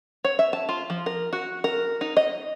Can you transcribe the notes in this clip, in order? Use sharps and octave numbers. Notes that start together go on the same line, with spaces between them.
C#5
E5
A5
F4
F3
A#4
F#4
A#4
D#4
D#5